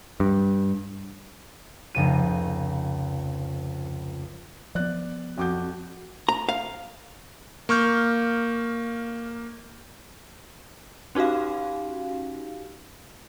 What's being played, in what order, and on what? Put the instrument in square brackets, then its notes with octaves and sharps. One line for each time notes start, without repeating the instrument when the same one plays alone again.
[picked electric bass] G2
[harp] F1 C#2 D#7
[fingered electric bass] F3 B3 [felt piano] D5 F#6
[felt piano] F2 D6 G6 [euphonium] F#4
[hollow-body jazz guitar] A#5
F5
[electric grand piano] A#3 C#6 F6 G6
[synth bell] C#4 D#4 F#4 G4 F5